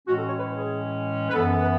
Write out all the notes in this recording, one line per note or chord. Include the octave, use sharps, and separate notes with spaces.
A2 E3 G#3 C#4 F#4
A4
C#5
B4
G#4
B4
F#2 E3 B3 A4
B4